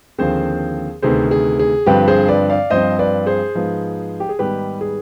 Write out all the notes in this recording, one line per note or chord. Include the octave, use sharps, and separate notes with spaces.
D#2 D3 F3 C4 G#4 C5
D2 C3 D#3 B3 G#4 C5
G#4
G#4
G2 D3 F3 C4 G4 B4
G#4 C5
B4 D5
D5 F5
G2 F3 C4 C5 D#5
B4 D5
G#4 C5
G#2 F3 B3
G4
G#4
G#2 D#3 G3 B3 G4 B4
G#4